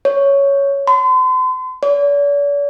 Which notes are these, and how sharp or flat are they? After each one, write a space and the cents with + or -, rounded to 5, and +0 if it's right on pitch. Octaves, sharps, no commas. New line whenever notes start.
C#5 +5
C6 -40
D5 -45